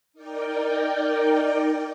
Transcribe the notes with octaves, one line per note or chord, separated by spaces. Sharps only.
D#4 A#4 D5 G5